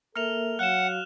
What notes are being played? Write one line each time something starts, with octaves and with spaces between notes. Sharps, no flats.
A#3 A4 A#4 E5 F6 F7
F#3 F#4 F5 F#5 F#6 E7